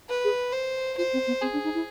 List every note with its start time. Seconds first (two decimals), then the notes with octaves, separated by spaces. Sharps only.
0.09 B4
0.24 G#4
0.52 C5
0.97 F4 C5
1.12 C4
1.27 B3
1.41 C4 G#4
1.52 D4
1.63 D#4
1.74 E4